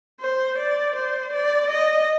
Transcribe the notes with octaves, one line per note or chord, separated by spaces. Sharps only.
C5
D5
C5
D5
D#5